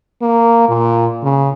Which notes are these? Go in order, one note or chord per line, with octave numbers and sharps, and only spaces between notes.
A#3
A#2
C#3